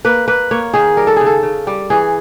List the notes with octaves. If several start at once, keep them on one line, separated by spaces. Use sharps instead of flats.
A#3 B4
A#3 B4
A#3 C#5
D#3 G#4
G3 A#4
A4
C#3 G#4
A4
C#3
G3
E3 G#4